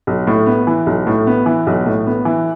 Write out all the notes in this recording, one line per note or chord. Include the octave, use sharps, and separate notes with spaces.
B1
A2
B3
E3
B1
A2
B3
E3
B1
A2
B3
E3